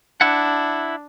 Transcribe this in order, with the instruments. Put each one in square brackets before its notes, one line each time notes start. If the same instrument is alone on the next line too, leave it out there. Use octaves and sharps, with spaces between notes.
[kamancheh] D4 [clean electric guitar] E4 F#5